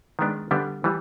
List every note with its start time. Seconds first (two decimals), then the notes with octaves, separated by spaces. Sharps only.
0.19 D#3 G#3 B3 D4
0.51 D3 G3 B3 D4
0.84 E3 G3